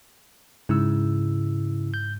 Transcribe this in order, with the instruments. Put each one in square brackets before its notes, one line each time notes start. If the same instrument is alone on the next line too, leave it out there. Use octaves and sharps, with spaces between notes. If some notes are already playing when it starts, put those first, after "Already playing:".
[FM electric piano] G#2 [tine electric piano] C#3 E4 E6
[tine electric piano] G6